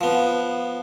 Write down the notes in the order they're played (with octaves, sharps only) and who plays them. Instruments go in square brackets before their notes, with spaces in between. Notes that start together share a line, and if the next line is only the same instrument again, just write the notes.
[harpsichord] F3 B3